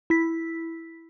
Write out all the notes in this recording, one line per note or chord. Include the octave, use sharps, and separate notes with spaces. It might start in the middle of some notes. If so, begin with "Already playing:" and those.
E4 B6